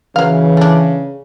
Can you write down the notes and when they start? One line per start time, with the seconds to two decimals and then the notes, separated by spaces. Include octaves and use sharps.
0.16 C#3 E3 F#3 F5
0.57 A3 D4